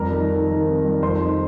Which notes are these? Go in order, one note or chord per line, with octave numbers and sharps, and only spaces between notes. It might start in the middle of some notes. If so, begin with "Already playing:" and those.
Already playing: F2 G3 A#4 A#5
D#3
D#3
D#3
C4
G3
F2 C5 C6
D#3